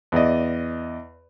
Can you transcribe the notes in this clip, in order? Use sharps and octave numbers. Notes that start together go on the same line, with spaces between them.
E2 D5 D#5